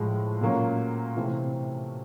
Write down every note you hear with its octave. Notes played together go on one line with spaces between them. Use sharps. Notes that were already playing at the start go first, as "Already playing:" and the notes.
Already playing: A2 F3 G#3
A#2 F#3 A#3 C#4
C3 E3 A3 C4